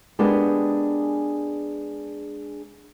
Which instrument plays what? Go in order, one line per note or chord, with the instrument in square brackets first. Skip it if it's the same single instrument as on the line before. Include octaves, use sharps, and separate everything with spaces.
[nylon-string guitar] G#3 B3 D4 G4 G#4 A#4